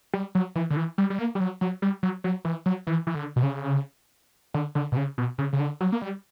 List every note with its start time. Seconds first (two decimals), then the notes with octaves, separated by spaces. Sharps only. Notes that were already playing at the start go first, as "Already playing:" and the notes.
0.14 G3
0.35 F#3
0.55 E3
0.70 D3
0.77 E3
0.98 G3
1.10 G3
1.19 A#3
1.35 G3
1.40 F#3
1.61 F#3
1.82 G3
2.03 F#3
2.24 F#3
2.45 E3
2.66 F#3
2.87 E3
3.07 E3
3.15 D3
3.36 B2
3.43 C#3
4.54 D3
4.75 D3
4.92 B2
4.97 C#3
5.18 B2
5.38 C#3
5.53 C#3
5.60 D3
5.81 F#3
5.92 A#3
6.02 G3